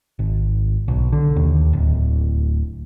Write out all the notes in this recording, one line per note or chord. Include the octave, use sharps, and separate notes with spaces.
G#1
B1
D3
D#2
D1